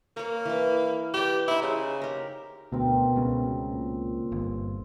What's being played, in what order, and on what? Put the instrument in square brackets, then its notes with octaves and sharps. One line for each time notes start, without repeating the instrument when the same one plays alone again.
[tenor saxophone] A#3 [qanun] C#5 A#5
[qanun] E3 E4
[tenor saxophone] G4 [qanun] B4 D5
[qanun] D#4 C5 [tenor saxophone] E4
[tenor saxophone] C#3
[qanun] G4 A#4
[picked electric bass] D2 [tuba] B2 [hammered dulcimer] C4 A#4
[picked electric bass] C#2 C#3
[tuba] A#2
[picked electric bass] G1